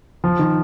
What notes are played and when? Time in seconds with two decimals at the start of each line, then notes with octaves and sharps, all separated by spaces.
0.24 F3
0.39 D#3